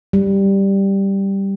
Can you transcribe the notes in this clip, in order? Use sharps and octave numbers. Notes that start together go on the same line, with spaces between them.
G3